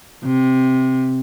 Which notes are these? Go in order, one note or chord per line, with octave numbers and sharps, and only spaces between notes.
C3